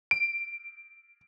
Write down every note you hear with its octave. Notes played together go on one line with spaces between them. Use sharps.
D7